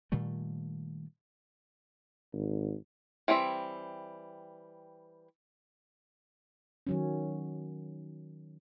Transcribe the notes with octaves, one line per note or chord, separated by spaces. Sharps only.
A#2 D#3 G3 A3
G#1
E3 G3 C4 E5
D#3 F#3 C#4